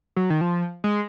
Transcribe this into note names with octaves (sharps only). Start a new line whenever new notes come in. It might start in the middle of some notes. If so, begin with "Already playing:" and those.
F#3
D#3
F3
G#3